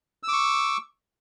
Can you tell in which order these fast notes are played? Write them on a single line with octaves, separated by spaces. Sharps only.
E6 D6 C#6